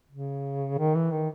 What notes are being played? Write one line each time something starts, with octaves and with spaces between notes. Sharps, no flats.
C#3
D#3
E3
D#3